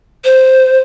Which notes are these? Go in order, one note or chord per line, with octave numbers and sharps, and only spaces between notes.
C5